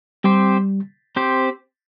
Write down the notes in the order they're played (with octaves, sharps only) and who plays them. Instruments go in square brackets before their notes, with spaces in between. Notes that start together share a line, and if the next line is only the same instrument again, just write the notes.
[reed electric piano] G3 [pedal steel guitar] C4 G4 C5
[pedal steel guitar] C4 G4 C5